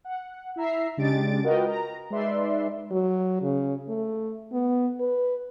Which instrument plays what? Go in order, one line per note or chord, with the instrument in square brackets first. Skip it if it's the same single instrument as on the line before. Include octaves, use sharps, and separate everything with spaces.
[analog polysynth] F#5
E4 E5 A#5 C7
C#3 G#3 D4 G4 A6 D7
F4 F#4 A#4 B4 D#5 G5
A#5
G#3 D#4 B4 D5 E5 C6
[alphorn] F#3
C#3
A3
B3
B4